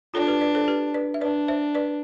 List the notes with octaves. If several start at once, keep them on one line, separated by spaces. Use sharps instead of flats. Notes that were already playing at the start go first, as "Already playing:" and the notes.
D4 F4 A4
G4 B4
B4 D5
A4 C5
G4 B4
B4 D5
E5
D4 B4 D5
C5 E5
B4 D5